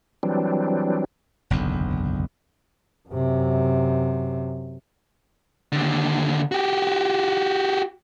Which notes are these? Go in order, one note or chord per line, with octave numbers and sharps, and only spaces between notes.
E3 F#3 G3 C4 D4
F#1 B1 E2 D3
F#2 C3
D#2 D3
F#4 G4